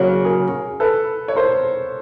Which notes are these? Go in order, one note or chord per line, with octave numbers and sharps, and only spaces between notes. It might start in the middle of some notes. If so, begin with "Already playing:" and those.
Already playing: C#3 F#3 A#3
G#4 A#4
A4 B4
C#5
A#4 C5